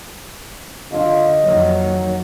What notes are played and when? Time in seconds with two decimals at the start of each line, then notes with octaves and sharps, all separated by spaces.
0.93 D3 F4 D#5
1.43 F2 D#3 F#3 A#3